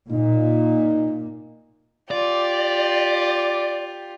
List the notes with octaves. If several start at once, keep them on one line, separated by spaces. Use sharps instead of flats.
A#2 D#4
F4 G4 D5